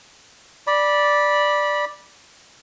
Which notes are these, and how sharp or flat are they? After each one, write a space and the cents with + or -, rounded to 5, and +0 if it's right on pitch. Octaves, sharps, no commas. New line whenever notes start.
D5 +0 B5 -15